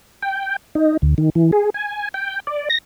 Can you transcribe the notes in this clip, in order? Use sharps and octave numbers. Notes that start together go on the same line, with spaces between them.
G5
D#4
D2
D#3
E3
G#4
G#5
G5
D5
A#6